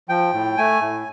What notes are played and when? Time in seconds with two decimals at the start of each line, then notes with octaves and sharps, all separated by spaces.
0.09 F3 G5
0.33 A2
0.57 A3 G#5
0.82 A2